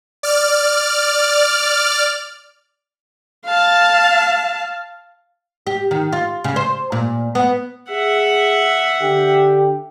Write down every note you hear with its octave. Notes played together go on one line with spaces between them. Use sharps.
D5 F6
F5 A5
G4
D#3
F4
C#3
C5
A#2
B3
G#4 E5 F#5
D3 G4